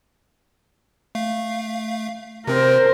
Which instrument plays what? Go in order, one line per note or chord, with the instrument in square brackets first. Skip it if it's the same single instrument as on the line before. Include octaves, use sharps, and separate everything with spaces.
[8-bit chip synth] A3 F5
[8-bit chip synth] C3 C4 [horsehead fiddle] A#4 C5